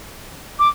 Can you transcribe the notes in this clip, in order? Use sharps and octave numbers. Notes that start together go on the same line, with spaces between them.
D6